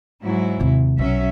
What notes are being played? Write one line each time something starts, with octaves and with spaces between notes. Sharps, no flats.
G#2 F#3 E4
D#2 C3
B1 F#3 C#4 E5